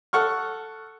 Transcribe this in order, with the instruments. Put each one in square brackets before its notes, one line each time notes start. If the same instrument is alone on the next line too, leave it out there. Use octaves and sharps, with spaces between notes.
[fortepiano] A4 F#5 C#6 F6